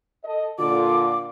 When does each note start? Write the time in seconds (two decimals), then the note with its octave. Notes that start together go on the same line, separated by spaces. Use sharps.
0.25 A4 D#5
0.59 A#2 D3 F4 D6